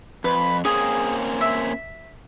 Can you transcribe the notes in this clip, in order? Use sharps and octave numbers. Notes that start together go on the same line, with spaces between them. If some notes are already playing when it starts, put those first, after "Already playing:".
F2 B4
A#3 C4 C#4 G#4
E5